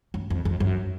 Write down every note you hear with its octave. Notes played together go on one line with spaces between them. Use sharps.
F#2
F2
F2
F#2